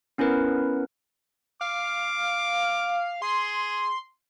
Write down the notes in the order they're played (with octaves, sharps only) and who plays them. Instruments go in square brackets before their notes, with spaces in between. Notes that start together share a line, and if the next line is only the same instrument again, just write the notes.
[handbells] B3 C#4 E4 A#4 B4
[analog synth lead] F5 [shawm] D6
[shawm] G#4 [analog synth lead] C6